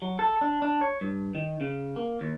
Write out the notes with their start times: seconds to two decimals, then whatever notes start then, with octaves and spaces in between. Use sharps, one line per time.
0.02 F#3
0.19 A4
0.41 D4
0.62 D4
0.81 C#5
1.01 G2
1.35 D#3
1.61 C#3
1.96 A#3
2.21 D#2